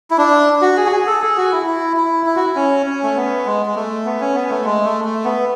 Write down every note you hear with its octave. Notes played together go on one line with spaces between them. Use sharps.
E4
D4
F#4
G#4
F#4
G#4
A4
G#4
F#4
E4
E4
E4
E4
F#4
E4
C#4
C#4
A3
B3
G#3
G#3
A3
B3
C#4
B3
A3
G#3
A3
A3
B3